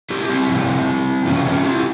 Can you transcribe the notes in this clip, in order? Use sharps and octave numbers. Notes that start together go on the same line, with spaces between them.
E4 G4
C4 E4
C3 F3
C3 E3 C#4 F4
C#4 F4
E4 G4